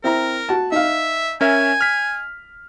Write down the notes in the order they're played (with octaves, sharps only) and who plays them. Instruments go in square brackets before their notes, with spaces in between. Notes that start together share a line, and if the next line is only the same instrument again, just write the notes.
[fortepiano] C4 E4 A#5 [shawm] A#4
[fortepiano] F#4 A5
[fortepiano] D#4 F5 [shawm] E5
[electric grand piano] C#4 A#4 E5 [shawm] G#5
[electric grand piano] F6 B6